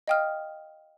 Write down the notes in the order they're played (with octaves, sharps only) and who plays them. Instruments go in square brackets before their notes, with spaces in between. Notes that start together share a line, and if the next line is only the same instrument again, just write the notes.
[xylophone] D#5 F5 G5 D#6 F6